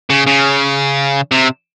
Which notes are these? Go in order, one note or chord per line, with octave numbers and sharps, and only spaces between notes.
C#3
C#3
C3